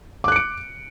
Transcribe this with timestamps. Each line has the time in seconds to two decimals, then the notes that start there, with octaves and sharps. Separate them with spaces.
0.24 D6
0.28 F#6
0.32 C#7
0.36 D7